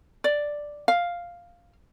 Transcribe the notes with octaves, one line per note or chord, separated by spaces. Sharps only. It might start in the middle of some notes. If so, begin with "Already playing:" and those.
D5
F5